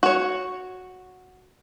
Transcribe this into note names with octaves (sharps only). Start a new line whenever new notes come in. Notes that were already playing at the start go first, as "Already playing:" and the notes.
F#4 C#5